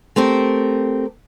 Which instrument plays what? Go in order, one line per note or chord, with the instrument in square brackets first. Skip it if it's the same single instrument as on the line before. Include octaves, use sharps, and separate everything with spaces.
[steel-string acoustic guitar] A3 C4 G4 A#4